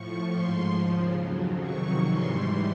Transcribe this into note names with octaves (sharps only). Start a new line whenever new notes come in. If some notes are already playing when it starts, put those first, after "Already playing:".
Already playing: A2 F3 C#6
G#2 F3 C6
D#2 C#3 F3
F2 C#3 F#3
F2 C3 D#3 F#3 C#6
G#2 E3 G3 C6